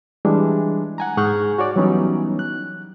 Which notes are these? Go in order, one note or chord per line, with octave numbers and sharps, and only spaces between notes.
E3 G3 G#3 D4
F#5 G#5 A#5
G#2 G#4 F#5 C#6 F6 G6
F#4 C#5 D5
E3 F#3 G3 B3 C#4 D#4
F#6